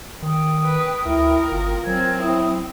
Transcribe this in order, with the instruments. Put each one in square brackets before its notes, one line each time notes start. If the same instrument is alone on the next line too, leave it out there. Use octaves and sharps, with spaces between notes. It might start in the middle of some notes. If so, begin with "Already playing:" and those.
[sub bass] D#3 [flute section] G5 D#6
[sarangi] B4
[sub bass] D2 [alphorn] E4 [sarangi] A#4
[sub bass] G1 [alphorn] F4
[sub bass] F#3 [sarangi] C4 [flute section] A#4 G#5 G#6
[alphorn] E4 [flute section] D#6